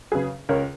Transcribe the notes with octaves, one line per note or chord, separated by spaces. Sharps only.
C#3 F#3 G#4 B4
C#2 A#4 C#5